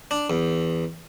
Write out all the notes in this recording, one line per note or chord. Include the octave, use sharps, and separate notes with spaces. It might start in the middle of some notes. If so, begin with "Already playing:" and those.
D4
E2